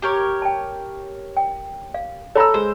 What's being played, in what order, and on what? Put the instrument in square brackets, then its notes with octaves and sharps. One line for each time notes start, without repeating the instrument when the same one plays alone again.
[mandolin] G4 A#4 C#5
[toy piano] G5 A5
G5
F5
[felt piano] A4 A#5 E6 [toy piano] C#5 B5
[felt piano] G#3 [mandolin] C5